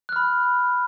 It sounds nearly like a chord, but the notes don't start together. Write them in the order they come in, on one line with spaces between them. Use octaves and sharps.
F#6 F6 B5